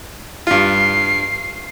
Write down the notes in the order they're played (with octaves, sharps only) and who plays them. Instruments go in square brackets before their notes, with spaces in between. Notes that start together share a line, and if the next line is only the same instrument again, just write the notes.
[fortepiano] G2 F4 [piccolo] C7